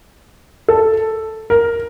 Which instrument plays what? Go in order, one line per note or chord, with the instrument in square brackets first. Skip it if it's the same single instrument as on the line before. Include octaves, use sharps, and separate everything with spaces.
[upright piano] A4
A#4